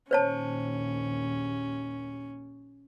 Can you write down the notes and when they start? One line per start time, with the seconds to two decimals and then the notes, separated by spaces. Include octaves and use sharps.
0.11 A#1 D#2 C#4 C5 C#5 A5